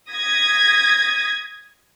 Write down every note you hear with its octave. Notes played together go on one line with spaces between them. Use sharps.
D#6 G#6 A#6 B6